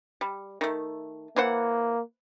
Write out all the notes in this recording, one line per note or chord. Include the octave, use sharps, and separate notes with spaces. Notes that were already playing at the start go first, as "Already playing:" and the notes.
G3
D#3 A3
E3 A#3 C5 F#5